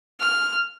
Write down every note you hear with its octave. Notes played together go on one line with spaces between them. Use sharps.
F6